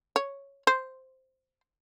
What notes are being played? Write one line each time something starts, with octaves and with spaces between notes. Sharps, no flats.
C#5
C5